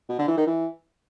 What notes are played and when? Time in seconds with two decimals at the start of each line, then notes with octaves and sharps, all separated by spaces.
0.09 B2
0.19 D3
0.28 E3
0.37 D#3
0.47 E3